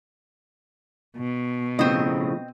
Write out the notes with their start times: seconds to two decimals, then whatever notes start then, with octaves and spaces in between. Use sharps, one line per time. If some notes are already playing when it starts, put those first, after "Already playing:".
1.17 B2
1.79 A2 C#3 F3 C4 D#5